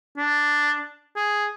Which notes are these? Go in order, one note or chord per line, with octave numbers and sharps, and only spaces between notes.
D4
G#4